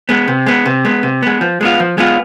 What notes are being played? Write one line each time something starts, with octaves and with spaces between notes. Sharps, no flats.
G#3 B3
C3
G#3 B3
C3
G#3 B3
C3
G#3 B3
F3
G#3 B3 F4
F3
G#3 B3 F4